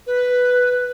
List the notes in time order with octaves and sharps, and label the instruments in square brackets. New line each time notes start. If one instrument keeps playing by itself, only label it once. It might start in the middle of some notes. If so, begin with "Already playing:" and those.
[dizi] B4